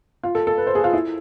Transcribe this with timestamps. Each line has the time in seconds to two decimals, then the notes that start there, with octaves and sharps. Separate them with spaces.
0.23 F4
0.35 A4
0.47 A4
0.58 B4
0.67 C5
0.75 G#4
0.84 F4
0.93 E4